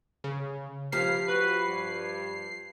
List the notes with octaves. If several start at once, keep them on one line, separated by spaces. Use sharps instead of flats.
C#3
G2 F3 E4 G4 F5 A#5 C7
F#4 B4
G2